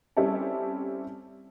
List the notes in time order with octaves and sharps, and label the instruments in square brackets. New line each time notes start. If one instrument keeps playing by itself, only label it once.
[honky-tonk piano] G3 C4 C#4 E4 G4 A4